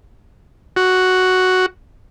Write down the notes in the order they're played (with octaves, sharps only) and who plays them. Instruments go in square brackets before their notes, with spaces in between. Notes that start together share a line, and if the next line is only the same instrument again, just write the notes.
[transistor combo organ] F#4